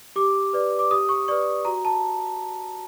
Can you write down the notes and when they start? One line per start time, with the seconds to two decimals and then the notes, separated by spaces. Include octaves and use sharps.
0.16 G4 D6
0.53 B4 D5
0.79 D6
0.91 G4 D#6
1.09 C#6
1.28 B4 D5 C#6
1.65 F#4 A#5
1.85 A5